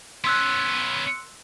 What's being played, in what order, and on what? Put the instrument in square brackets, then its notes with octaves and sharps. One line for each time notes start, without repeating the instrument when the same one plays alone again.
[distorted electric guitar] B3 C#4 [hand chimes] C6 E6 F#6